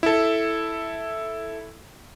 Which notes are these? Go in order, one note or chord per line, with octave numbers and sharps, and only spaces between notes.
E4 A4